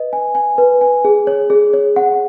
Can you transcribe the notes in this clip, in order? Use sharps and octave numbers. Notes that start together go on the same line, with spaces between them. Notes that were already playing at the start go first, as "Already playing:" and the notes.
Already playing: B4 D#5
G#5
G#5
B4
G#5
G#4
C#5
G#4
C#5
F#5